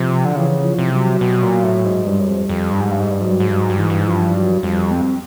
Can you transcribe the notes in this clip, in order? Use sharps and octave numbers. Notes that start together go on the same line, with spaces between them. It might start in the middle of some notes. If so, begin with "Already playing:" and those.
Already playing: C3 F3
D3
C#3 E3
F3
C3
F#3
B2
A#2
A2
G#2
G2 G3
F#2
F2
F2
G2
G#2
G2 G3
G#2
G2
G#2 F#3
G2
G#2
G2 F#3
G#2
G2
G#2 E3
G2
G#2
G2 F3
F#3
F2 G3
C4